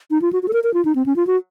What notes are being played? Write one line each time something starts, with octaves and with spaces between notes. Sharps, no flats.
D#4
F4
F#4
F#4
A4
A#4
A#4
F4
D#4
C4
C#4
F4
F#4